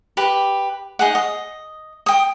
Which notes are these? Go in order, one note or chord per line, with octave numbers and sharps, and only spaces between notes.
G4 B4
D#4 G#4 F#5
D#5
G5 D#6